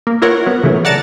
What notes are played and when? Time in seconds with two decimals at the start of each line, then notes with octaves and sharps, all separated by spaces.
0.07 A#3
0.22 E4 F4 A#4 C#5 F#5
0.46 F#3 B3
0.64 C#3 E3 F#3 A3 C#4
0.85 D5 F#5 A5 A#5 A6